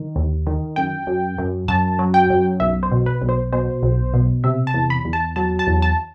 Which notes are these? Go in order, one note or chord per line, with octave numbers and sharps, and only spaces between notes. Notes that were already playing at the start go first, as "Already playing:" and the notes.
Already playing: D#3
D#2
D#3
F#2 G5
F#2
F#2
F#2 A5
F#3
G5
F#2
B1 E5
C5
B2
B4
B1
C5
B2 C5
B1
B2
C3 E5
A5
E2
B5
E2
A5
F#3 A5
A5
E2
A5